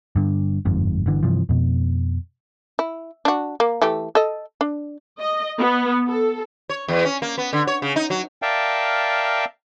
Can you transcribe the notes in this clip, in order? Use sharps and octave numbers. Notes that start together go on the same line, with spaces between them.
G2 D3
G1 F2 G#2
G1 D3 E3
G2 C3 E3 F3
F2 B2
E4
D4 F#4
A#3
E3 A3 G4
A4 D#5
D4
D#5
B3
A4
C#5
E2
C#4
A#3
B3
D3
C#5
C#3
D#4
F#3
A#4 D5 E5 F5 G5 A5